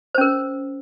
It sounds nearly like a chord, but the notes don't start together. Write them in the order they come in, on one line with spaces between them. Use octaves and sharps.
C5 C#4 A#4